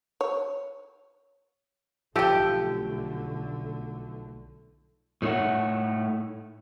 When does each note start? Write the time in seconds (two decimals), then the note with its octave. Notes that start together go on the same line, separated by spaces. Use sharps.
0.21 C#5
2.16 B1 D3 F3 A3 G4 A4 G5
5.22 A2 A3 D#4 C#5 F#5